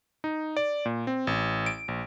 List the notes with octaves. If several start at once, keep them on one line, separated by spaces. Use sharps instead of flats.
D#4
D5
A#2
C4
A1
D7
A#1